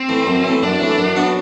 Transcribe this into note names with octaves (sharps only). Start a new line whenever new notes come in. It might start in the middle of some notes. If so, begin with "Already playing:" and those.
Already playing: C4
E3 A3
F#2
E3 A3
F#2 D4
E3 A3
F#2
F#3 B3 F#4